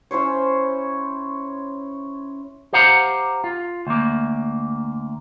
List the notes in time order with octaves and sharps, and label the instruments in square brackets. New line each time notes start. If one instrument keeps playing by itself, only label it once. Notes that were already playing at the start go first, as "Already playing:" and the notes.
[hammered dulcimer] C#4 E4 C5 C#5
[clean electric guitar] G4 C5 F5 F#5 A#5
F4
D2 A#3